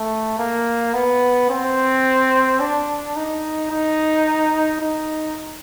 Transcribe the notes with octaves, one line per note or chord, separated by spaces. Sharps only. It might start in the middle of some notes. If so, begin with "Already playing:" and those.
Already playing: A3
A#3
B3
C4
D4
D#4
D#4
D#4